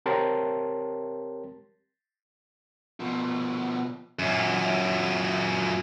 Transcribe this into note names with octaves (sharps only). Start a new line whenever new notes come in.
C4 G4 A#4 C#5 A5 C6
B2 F3
F#2 A#2